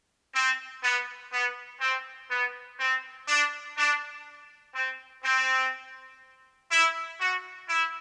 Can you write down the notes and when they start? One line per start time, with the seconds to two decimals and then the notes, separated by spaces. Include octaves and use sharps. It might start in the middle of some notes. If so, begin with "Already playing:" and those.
0.34 C4
0.83 B3
1.32 B3
1.81 C4
2.31 B3
2.79 C4
3.28 D4
3.78 D4
4.75 C4
5.24 C4
6.71 E4
7.20 F#4
7.69 E4